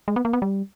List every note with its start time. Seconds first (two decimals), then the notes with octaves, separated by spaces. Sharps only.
0.08 G#3
0.16 B3
0.25 A#3
0.33 B3
0.42 G3